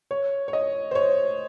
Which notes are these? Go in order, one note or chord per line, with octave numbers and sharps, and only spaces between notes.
C#5
C#5
D#5
C5
C#5